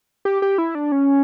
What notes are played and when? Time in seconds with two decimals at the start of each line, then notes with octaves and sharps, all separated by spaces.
0.25 G4
0.42 G4
0.58 E4
0.75 D4
0.92 C#4